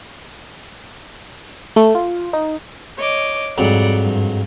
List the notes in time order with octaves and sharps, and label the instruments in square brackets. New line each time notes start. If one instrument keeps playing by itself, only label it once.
[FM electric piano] A3
F4
D#4
[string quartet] C#5 D#5 D6
[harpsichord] F2 G#2 F#3 [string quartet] G3 D5 F#5
[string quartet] G2